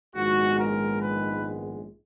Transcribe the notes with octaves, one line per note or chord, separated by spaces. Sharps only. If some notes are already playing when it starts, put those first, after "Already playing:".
A#1 G#2 D#3 G#3 B3 F#4
A#4
B4